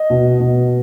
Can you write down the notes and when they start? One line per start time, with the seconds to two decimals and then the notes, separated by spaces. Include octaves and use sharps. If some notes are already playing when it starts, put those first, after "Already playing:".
Already playing: D#5
0.10 B2
0.40 B2